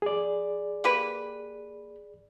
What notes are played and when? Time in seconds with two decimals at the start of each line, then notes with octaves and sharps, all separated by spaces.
0.02 G#4 D5
0.84 A#3 G4 B4